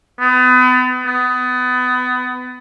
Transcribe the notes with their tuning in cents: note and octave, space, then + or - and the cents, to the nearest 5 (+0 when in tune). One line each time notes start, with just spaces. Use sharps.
B3 +35
B3 +25